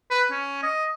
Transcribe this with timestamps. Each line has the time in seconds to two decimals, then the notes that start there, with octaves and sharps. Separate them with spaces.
0.10 B4
0.31 C#4
0.63 D#5